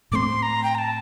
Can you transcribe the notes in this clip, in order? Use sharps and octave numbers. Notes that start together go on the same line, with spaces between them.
A2 A3 C4 C6 D6
A#5
G5
A#5
A5